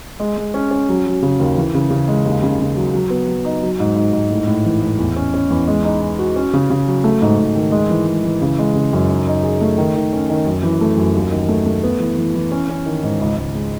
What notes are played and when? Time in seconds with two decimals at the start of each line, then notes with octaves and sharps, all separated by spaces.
0.20 G#3
0.37 G#3
0.54 C#4
0.71 C#4
0.89 F#3
1.06 F#3
1.22 C#3
1.40 D#2
1.57 E3
1.74 C#3
1.90 C#3
2.08 G#3
2.25 D#2
2.43 C#3
2.60 C#3
2.77 F#3
2.93 F#3
3.10 B3
3.28 F#3
3.45 D#4
3.63 F#3
3.80 G#2
3.96 G#2
4.13 G#2
4.30 A2
4.47 A2
4.65 E3
4.82 A2
4.99 E2
5.16 C#4
5.34 C#4
5.50 E2
5.68 G#3
5.84 D#4
6.01 D#4
6.19 F#4
6.36 C#4
6.53 C#3
6.70 C#3
6.88 F#3
7.04 A3
7.22 G#2
7.38 G#2
7.56 D#3
7.72 G#3
7.90 E3
8.07 G#3
8.24 E3
8.41 C#3
8.59 G#3
8.75 C#3
8.93 F#2
9.10 D#4
9.27 D#4
9.43 G#4
9.61 A3
9.78 D#3
9.96 D#3
10.13 C#4
10.30 D#3
10.46 F#2
10.63 E3
10.81 A3
10.97 F#2
11.14 D#2
11.32 D#3
11.48 A3
11.66 A3
11.83 B3
12.00 E3
12.17 E3
12.35 E3
12.51 C#4
12.69 C#4
12.86 D#3
13.03 G#2
13.21 C#2
13.37 C#2
13.55 G#3